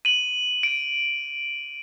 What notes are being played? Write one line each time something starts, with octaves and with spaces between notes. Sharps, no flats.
D#7 F#7
D7